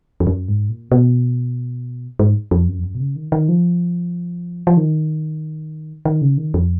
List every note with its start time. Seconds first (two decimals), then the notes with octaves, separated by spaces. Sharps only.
0.20 F2
0.27 F#2
0.48 G#2
0.69 A#2
0.92 B2
2.19 G#2
2.51 F2
2.68 F#2
2.79 F2
2.84 F#2
2.95 B2
3.00 C#3
3.16 D#3
3.32 D#3
3.49 F3
4.67 F3
4.77 D#3
6.05 D#3
6.21 C#3
6.37 D#3
6.54 F2